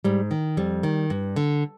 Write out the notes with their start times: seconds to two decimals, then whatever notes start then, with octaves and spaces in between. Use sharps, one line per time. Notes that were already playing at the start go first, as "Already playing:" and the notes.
0.04 G#2 G3
0.31 D#3
0.57 F2 G3
0.83 D#3
1.10 G2
1.36 D3